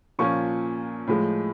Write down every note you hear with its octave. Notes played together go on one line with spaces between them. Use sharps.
A#2 F3 A#3 C#4 C#6
A2 F3 G#3